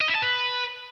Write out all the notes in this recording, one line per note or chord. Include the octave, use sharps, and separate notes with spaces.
D#5
E4
A5
B4